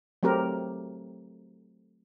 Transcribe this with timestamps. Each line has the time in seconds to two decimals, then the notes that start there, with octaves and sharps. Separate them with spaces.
0.23 F#3 A3 C4 G4 A#4